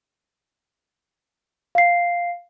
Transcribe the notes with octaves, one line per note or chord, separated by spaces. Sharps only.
F5 C7